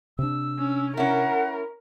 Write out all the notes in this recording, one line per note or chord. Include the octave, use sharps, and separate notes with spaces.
C3 D4 E6
C#4
C#4 E4 A#4 F#5